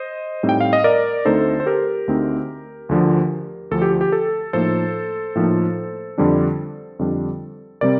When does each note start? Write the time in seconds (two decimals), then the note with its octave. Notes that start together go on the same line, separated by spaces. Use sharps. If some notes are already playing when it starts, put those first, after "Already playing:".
Already playing: C5 D#5
0.43 A2 G3 C4 D#4
0.49 G5
0.61 F5
0.73 D#5
0.84 A#4 D5
1.25 D2 D3 A3 C4 D#4 A4 C5
1.60 C5
1.66 G4 A#4
2.08 D2 D3 A3 C4 D#4
2.89 D2 D3 F3
3.71 D2 D3 F3 A4
3.82 G4
4.01 G4
4.12 A4
4.53 A2 F3 A#3 D#4 A4 C5
5.35 A2 F3 A#3 D#4
6.18 F2 D3 G3 D4
6.99 F2 D3 G3 D4
7.81 C3 G3 C4 A#4 D5